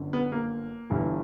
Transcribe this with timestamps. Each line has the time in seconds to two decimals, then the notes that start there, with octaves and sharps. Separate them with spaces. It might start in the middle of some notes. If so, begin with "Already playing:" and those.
Already playing: G1 F#2 D3
0.13 B3
0.32 A#3
0.90 G1 G2 E3